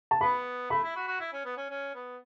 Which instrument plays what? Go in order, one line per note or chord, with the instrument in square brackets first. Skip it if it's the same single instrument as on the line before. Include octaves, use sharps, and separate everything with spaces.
[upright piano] A5
[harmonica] B3 [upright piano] B5
[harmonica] A3 [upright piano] B5
[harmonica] E4
F#4
F#4
E4
C#4
B3
C#4
C#4
B3